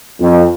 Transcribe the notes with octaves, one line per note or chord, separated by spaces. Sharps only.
F2